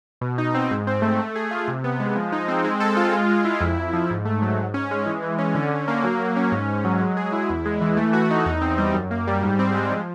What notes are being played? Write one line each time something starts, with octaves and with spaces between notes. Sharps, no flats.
B2
D#4
C4
G#2
C4
A3
A3
G#4
F4
C3
B3
G#3
F3
D#4
C4
G#3
A4
F4
G#3
G#3
E4
F2
F2
F3
G#2
A3
F#3
G#2
C#4
G#3
E3
E3
C#4
D3
D3
A#3
F#3
F#3
C#4
G#2
G#2
F#3
G#3
G#4
E4
E2
G#3
E3
A3
F#4
D#4
E2
C4
G3
F#2
A#3
G3
G#2
C4
G#3
F3